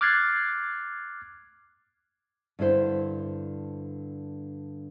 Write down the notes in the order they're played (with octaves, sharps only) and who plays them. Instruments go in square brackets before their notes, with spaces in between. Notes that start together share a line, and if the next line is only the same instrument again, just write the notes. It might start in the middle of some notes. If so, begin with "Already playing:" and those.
[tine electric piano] D6 F6 F#6 G#6 A6 C7
[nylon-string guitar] G2 D3 E4 C5